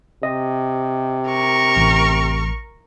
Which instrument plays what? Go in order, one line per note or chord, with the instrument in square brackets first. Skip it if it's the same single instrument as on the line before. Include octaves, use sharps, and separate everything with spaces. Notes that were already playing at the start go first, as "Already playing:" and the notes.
[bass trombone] C3 [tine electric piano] D#5
[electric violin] A#4 C#6
[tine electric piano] A1